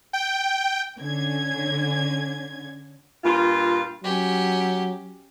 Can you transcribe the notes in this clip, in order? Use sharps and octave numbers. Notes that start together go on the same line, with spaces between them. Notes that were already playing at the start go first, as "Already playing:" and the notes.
G5
D3 C#4 G#6
G2 A#2 F4
F#3 C#4 G4